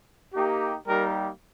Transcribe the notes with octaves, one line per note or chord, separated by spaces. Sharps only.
A#3 D#4 G4
G3 A#3 D#4 G4 A#4